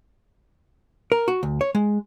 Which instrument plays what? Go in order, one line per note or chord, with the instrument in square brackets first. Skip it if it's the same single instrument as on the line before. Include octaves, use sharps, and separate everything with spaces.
[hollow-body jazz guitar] A#4
F#4
D2
C#5
G#3